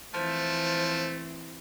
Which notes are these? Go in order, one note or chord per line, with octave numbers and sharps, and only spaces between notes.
E3 F3 A3 C4 C5